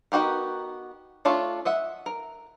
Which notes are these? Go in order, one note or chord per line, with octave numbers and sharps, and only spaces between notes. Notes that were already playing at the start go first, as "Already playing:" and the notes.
B3 D#4 F#4 G4 A#4
A3 D4 F4 A4 C#5
D#5 E5 F#5
A#4